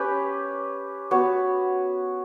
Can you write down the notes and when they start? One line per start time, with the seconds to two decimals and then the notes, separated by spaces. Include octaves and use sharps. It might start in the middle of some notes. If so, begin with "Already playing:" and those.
Already playing: C#4 G4 B4
1.11 B3 F#4 C#5